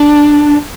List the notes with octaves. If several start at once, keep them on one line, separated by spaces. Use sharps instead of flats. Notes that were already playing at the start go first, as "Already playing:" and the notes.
Already playing: D4